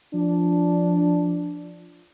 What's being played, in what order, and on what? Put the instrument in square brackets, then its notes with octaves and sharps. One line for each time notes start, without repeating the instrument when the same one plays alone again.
[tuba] F3 [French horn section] D4